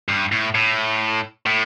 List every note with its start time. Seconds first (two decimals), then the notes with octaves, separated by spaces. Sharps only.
0.08 G2
0.32 A2
0.55 A2
1.46 A2